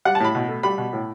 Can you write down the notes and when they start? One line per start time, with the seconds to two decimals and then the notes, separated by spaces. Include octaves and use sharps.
0.05 G3 F#5
0.15 A5
0.20 A2 B5
0.35 B2
0.49 A3
0.63 G3 B5
0.78 B2
0.93 A2